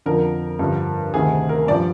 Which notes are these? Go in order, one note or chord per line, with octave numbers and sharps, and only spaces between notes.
F2 D3 F3 A#4
G2 D3 F3
D2 C3 D#3 G#4
A#4
G2 F3 D5